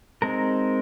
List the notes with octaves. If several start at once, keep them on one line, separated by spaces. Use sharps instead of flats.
G#3 C4 D#4 A#4